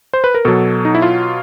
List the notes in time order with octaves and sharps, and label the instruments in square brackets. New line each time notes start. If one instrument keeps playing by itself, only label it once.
[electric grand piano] C5
B4
A#4
B2 F#3 A4
D#4
E4
F4